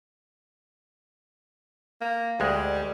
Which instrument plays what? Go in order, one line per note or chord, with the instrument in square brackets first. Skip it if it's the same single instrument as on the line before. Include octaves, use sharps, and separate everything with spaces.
[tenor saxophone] A#3
[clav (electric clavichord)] D2 G#3 [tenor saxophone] G3